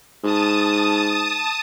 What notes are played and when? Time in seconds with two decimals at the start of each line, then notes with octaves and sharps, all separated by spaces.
0.24 G#2 A5 D#6